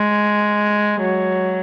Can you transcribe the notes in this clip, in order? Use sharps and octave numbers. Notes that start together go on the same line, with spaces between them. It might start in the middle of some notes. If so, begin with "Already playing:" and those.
Already playing: G#3
F#3